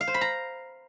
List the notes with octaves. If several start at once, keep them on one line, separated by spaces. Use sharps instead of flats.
F5
C5
B5
A#5